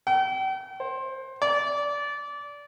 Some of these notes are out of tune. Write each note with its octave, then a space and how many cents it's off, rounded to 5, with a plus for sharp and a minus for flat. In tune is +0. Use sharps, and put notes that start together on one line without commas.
G5 -40
C5 +20
D5 -20